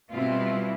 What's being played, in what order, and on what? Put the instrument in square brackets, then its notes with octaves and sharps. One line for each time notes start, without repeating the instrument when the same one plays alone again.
[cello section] B2 G3 C4 E4 F4